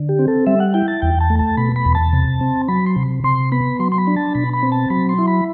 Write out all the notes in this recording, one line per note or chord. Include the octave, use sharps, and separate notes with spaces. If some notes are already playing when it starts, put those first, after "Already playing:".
Already playing: D3
G4
C4
A4
G3 E5
F#5
E4 G5
A5
E2 G5
A5
A3
A5
B2 B5
B5
E2
A5
C3
C4
F#3 B5
C6
C3
C3 C6
B3 B5
F#3 C6
C6
B5
D4
A5
B2 B5
B5
C4
A5
F#3 B5
C6
E4
B5